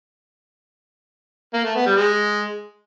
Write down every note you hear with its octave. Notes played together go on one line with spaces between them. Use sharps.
A#3
A3
B3
G3
G#3